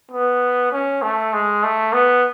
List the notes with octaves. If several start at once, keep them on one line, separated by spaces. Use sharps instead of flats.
B3
C#4
A3
G#3
A3
B3